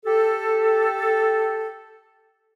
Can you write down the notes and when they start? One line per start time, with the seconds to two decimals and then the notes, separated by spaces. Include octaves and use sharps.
0.06 G4 A4